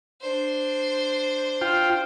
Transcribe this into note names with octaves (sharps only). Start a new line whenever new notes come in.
D4 C5
F4 G5